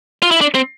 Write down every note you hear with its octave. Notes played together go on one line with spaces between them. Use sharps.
F4
E4
D4
C4